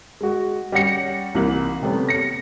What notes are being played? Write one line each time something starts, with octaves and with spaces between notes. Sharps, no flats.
G#3 F#4
G3 C#4 C#5 F#5 A#6 C#7
C2 E3 A#3 F#7
C3 G3 A3 B3 C#4
A#6 C#7